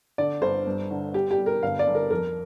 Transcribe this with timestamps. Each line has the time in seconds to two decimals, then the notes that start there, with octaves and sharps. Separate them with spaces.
0.18 D3 D5
0.41 G1 C5
0.67 G2
0.91 D3
1.14 G3 G4
1.31 G4
1.38 G3
1.46 A#4
1.63 G1 F5
1.79 D5
1.87 G1
1.95 A#4
2.10 F2 A#4